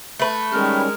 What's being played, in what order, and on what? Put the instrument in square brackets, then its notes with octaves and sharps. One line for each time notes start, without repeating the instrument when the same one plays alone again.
[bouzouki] A3 B4
[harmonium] D#3 G3 C#4 [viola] G#3 A#4 [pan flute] F6